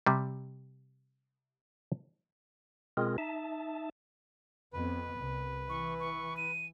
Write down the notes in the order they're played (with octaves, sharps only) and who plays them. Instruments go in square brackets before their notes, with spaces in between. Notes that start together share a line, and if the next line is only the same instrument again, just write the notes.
[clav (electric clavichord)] C3 G3
[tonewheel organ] B2 G#3 C4 F4 G#4 A#4
D#4 E5 A5
[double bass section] F2 B3 [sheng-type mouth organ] B4
[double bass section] C2
[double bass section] E3 [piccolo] C#6
[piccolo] C#6
D#7